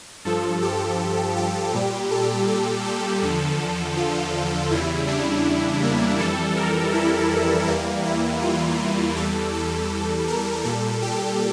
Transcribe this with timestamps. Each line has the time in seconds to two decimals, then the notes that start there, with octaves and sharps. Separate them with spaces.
0.25 G2 F3 A4
0.62 G4
1.37 G4
1.73 A#2 G3
2.11 A4
2.48 A4
2.85 A4
3.22 E2 D3 F3
3.97 F4
4.70 E2 C#3 G3 E4
5.08 D4
5.82 A#3
6.19 F2 E3 G3 A4
6.57 A#4
6.94 E4
7.68 E2 E3 G3 A#3
8.05 E4
8.42 F4
8.80 F4
9.16 E2 E3 G3 A4
9.54 A4
10.28 A#4
10.65 A#2 G3 A4
11.02 G4